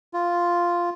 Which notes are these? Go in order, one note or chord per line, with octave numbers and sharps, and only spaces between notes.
F4